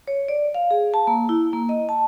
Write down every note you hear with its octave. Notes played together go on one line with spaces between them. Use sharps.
C#5
D5
F5
G#4
A5
A#3
E4
A#3
D#5
A5